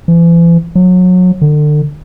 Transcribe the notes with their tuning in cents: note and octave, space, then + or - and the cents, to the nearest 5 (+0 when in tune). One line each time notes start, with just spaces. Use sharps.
E3 +40
F#3 -25
D3 +30